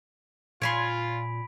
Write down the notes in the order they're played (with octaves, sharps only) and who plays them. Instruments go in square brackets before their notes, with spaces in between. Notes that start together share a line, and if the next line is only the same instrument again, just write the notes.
[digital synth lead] A#2 [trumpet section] F4 [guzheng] C#5 G#5 C6 [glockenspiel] B5 B6 D7